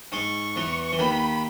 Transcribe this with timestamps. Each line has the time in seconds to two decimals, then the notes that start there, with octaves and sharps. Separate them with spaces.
0.12 G#2 G#3 C#6
0.56 E2 E3
0.92 E3
0.99 D#2 D#3 B5